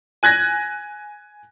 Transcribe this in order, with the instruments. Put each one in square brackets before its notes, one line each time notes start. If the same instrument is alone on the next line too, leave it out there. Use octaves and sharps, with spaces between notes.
[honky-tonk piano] G#5 F#6 G#6 A#6